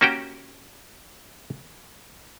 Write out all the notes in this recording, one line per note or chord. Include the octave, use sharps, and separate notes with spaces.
A#3 C#4 F#4 G4 G5